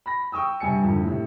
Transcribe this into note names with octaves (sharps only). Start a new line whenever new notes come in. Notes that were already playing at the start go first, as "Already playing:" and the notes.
B5 A#6
G5 C#6 D#6 E6
G2 C3 G3 G#5 C#7
G#1 F2 D3
A2 C3